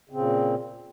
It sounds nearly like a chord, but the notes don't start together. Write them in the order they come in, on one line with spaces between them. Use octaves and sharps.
C#3 C4 A#2